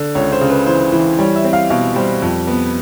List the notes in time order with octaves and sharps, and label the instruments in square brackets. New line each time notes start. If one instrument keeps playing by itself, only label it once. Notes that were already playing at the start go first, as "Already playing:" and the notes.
Already playing: [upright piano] D3
C#2 C#5
C5
C#3
B4
E3 C5
E3
G3 C#5
E5
C4
F5
B2 F5
G3 C5
F2
B3